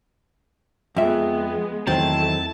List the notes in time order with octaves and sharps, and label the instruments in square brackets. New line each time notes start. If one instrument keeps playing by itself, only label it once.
[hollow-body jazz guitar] F2 E5 [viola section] G#3 B3
[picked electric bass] E2 D#3 F#3 [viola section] A3 E4 [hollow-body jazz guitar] C4 [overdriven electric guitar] A5